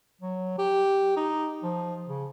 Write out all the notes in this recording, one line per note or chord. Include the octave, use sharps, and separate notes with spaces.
F#3
G4
D#4
F3
C#3